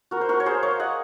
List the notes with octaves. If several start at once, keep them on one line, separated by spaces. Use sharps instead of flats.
F#4 A#4
C5
F#4 A#4
C#5
G#4 C5
C#5 F5
D#5 F#5